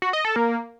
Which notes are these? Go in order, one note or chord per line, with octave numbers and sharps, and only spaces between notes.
F#4
D#5
A4
A#3